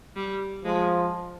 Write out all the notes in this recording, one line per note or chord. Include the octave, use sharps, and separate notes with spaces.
G3
F3 G#3